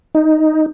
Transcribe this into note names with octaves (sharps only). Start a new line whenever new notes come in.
D#4